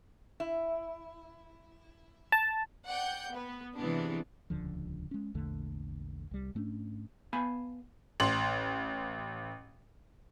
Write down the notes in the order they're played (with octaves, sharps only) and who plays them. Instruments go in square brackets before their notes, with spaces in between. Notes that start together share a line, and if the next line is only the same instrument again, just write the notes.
[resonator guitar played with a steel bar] E4
[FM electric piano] A5
[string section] D5 F#5 G5 G6
B3 B4
C3 E3 G#3 B3 D4
[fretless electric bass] D#1 C#2 D3 F3
G#3 C#4
A#1 E2 D3 A3
C2 G3
G#2 A3 C#4 D4
[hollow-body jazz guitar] B3 F5 G#5 A5 B5
[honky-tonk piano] A1 C6 F#7